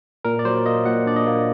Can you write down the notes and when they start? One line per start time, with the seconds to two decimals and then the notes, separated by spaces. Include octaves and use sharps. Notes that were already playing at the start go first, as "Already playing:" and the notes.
0.25 A#2 A#4
0.39 D5
0.45 F#3 C5
0.66 A#3 D#5
0.86 A#2 F#5
1.06 D4 D5
1.16 D#5
1.27 A#3